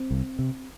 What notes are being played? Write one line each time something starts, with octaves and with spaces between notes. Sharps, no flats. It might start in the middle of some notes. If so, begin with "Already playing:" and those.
Already playing: C4
C2
C3